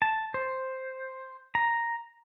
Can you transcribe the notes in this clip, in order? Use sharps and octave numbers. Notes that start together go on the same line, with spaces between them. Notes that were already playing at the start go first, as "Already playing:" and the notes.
A5
C5
A#5